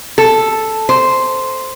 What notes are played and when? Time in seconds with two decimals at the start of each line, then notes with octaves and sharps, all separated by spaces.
0.18 A4
0.89 C5